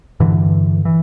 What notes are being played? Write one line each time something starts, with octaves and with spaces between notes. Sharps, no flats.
G2 D3 E3
E3